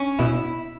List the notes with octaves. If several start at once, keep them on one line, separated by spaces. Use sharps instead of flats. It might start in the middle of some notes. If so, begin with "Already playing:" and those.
Already playing: C#4
B2 E4